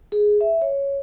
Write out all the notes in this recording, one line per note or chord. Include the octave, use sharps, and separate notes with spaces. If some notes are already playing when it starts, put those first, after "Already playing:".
G#4
E5
C#5